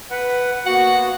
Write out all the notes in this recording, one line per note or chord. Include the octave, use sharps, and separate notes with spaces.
B4 F#5
A#3 B3 F#4 F#5